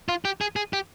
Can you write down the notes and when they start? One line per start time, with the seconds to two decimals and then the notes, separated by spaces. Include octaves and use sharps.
0.09 F4
0.25 G4
0.41 G#4
0.56 G#4
0.73 G4